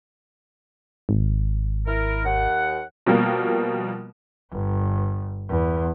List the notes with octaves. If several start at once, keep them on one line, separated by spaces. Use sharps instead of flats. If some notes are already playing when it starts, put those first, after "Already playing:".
G#1
E4 A#4
D#2 F#5
B2 F3 G3 A#3 A#4
G1
E2